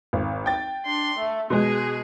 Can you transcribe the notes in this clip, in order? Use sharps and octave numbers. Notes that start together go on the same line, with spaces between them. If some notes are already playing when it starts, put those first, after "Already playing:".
G#1
G5 A6
D4 C6
A3
B2 G#3 G#4